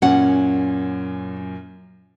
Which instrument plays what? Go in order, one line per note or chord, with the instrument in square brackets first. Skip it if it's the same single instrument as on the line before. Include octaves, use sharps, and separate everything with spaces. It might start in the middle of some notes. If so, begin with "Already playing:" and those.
[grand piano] F#2 A#2 [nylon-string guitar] C#4 F#5